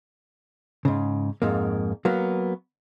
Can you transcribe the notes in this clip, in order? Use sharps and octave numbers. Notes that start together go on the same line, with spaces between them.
G#2 C#3
F2 G#2 A#3
F#3 A#3 B3